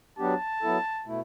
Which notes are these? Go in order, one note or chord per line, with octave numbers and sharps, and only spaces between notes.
F#3 B3 D4 G4 A5
F#3 B3 E4 A4
B2 A3 E4